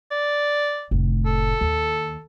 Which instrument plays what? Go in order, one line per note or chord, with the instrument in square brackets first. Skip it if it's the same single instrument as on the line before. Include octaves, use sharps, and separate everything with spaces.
[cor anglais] D5
[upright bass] F1 A2
[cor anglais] A4
[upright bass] D#2